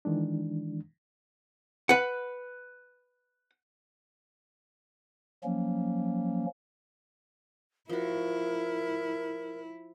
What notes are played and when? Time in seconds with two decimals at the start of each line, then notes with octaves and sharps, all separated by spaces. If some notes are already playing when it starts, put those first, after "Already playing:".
0.05 D#3 E3 G#3 D4
1.89 B4 F#5
5.44 F3 F#3 A#3 C#4
7.89 F3 E4 F#4 A#4